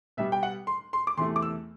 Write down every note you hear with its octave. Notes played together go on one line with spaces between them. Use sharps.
B2 G3 B3 E5
G5
F#5
C6
C6
D6
E2 C3 E3 A3 C6
D6
E6